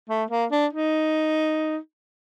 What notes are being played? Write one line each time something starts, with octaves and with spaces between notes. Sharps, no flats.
A3
A#3
D4
D#4